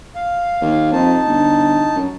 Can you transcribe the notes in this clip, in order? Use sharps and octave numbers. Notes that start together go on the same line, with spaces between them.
F5
D#2
F2 D#4 A5
G1
F#2